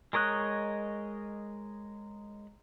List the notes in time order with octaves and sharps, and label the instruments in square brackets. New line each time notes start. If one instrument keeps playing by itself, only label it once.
[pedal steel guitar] G#3 A#4 C#5 D#5 F#6